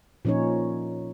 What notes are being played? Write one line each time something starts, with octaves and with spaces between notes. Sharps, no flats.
A#2 F3 C#4 D#4 C#5